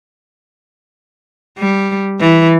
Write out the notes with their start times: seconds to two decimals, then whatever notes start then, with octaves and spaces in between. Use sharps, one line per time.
1.59 G3
2.20 E3